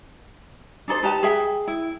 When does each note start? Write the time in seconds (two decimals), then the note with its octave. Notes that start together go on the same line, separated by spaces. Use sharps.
0.88 D4 D#4 A4 C5
1.03 D#4 G4 B4 A5
1.23 G#4 E5 G5
1.68 E4